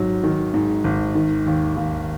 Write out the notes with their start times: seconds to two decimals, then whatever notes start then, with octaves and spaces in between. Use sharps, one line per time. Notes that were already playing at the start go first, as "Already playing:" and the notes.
Already playing: G#1 G#2 F#3
0.23 D#3
0.54 G#2
0.84 G#1
1.15 D#3
1.46 D#2
1.76 D#2